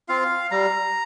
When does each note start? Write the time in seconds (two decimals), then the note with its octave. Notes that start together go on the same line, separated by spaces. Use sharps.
0.09 C4 F4 F5
0.51 G3 A#5